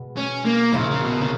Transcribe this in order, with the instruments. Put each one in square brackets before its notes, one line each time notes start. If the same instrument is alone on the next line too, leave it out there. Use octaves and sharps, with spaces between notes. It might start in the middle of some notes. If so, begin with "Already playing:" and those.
Already playing: [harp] B2 G#3 B3
[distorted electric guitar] C#4
A#3
[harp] A#1 A#2 A#3 E4 [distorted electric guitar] C#3
[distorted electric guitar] C#3
B2
C#3